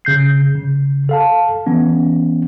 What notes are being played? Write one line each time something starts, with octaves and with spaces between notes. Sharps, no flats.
C#3 G6 C7
C#3
A4 F5 A5
E3 B3 C#4